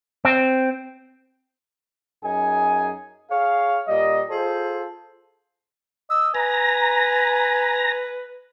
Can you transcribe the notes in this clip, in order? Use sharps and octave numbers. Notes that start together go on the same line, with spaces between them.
C4
F#2 D#4 G#4 G#5
G#4 C#5 F5
A#2 G3 D#5
F4 G#4 A4 C5
D#5 E6
B4 G#5 A#5